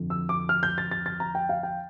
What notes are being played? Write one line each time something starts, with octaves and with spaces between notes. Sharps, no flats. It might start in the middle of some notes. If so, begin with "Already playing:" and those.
Already playing: F2 D3 F3
E6
D6
F6
G6
A6
A6
A6
A#5
G5
F5
G5